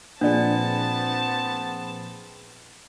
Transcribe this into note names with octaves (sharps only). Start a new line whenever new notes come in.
A#2 F3 B3 C4 D4 G#4 D5 A5